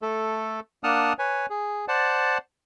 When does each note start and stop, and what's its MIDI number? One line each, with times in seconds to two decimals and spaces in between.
0.02 0.60 57
0.02 0.60 69
0.84 1.13 58
0.84 1.13 62
0.84 1.13 78
0.84 1.13 81
0.84 1.13 87
0.84 1.13 89
1.19 1.46 71
1.19 1.46 73
1.19 1.46 80
1.50 1.85 68
1.88 2.38 72
1.88 2.38 74
1.88 2.38 78
1.88 2.38 81